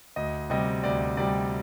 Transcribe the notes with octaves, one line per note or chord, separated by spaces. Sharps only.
D2 D#5
C3 G3 D#5
D2 D5
C3 G3 D5